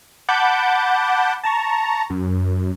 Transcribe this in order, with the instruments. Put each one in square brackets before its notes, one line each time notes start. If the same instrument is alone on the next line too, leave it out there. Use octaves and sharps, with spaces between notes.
[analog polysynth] F#5 A5 B5 D6 G6
A5 A#5 C#6
F#2